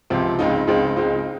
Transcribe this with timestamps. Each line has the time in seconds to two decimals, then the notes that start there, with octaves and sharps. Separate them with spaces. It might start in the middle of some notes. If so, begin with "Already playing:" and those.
0.10 C#2 C3 F3 C4
0.39 C#2 C#3 G#3 C4 D#4
0.67 C#2 C#3 G#3 C4 D#4
0.96 C#2 C#3 G#3 C4 D#4